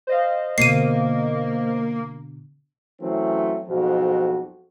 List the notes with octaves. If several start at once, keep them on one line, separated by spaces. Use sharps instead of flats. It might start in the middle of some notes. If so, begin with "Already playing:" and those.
C5 D#5 F5
B2 D3 A#3 C7 D#7
E3 F#3 A3 C4 C#4
B1 F2 G#2 F#4